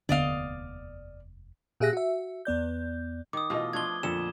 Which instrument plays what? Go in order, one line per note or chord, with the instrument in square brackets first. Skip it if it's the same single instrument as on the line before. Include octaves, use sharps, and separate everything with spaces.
[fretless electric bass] F1 D#2 B3 [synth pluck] D3 [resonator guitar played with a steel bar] D5 D#5 F5
[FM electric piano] A#2 G4 G#4 E5 F#6 A#6
F#4 E5
E2 B3 D5 G6
[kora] D#3 [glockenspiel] D6 D#6
[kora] B2 E3 A3 [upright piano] F4 D#5
[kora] F3 A3 D4 [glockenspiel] G#6 G7
[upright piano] F2 A#2 [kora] D3 [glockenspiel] E7